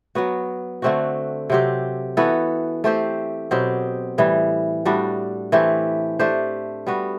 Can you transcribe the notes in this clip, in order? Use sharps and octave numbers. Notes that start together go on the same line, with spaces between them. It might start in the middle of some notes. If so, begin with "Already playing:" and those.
F#3 B3 F#4
D3 A3 C4 F#4
C3 F#3 C4 G4
E3 B3 F#4 A4
A3 C4 G4 C5
B2 F#3 C4 G4
A2 E3 G3
A2 G3 D4 F#4
E3 A3 C4 G4
A3 D4 G4 C5
G3 B3 F#4